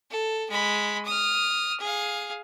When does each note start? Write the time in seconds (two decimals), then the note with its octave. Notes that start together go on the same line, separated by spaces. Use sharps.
0.11 A4
0.50 G#3 B5
1.05 D#6 F6
1.80 G#4 F5